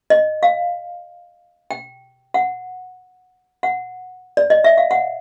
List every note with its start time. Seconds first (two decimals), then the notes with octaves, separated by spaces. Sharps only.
0.10 D#5
0.43 F5
1.71 G5
2.34 F#5
3.63 F#5
4.37 D5
4.50 D#5
4.64 E5
4.77 F5
4.91 F#5